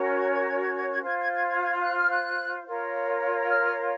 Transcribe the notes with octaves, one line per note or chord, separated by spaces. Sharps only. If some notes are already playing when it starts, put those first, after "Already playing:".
Already playing: C#4 F#4 A#4 C#5
G#6
G#6
G#6
G#6
G#6
G#6
F4 C5 G#6
G#6
G#6
G#6
G#6
F#6
F6
F#6
F4 A#4 C#5
F6